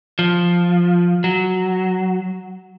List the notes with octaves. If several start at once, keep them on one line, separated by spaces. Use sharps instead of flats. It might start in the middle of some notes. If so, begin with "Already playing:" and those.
F3
F#3